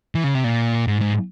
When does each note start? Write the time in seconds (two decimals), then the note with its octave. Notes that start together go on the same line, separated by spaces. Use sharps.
0.15 E3
0.24 C#3
0.34 C3
0.44 A#2
0.87 G#2
1.01 G#2